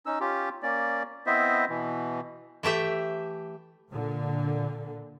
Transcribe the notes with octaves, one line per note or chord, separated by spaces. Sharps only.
C#4 D#4 E6
C#4 F4 G4
A#3 C#4 D5
B3 C4 E4 C5 D#5 E5
B2 E3
E3 A3 G4 E5
A#2 D3